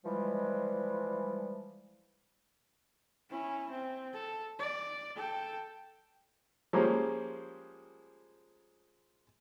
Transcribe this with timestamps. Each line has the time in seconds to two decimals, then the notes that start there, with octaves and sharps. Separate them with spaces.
0.05 E3 F3 G3 G#3
3.30 C#4 E4
3.70 C4
4.14 A4
4.59 D5
5.16 A4 G5
6.73 F3 G3 G#3 A#3 C#4